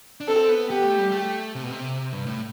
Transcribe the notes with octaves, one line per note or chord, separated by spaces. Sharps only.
D4
C4 A4
B3
B3 G4
A3
G3
A3
C3
B2
C3
G2
A2